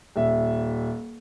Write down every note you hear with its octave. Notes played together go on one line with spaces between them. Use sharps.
D#1 E5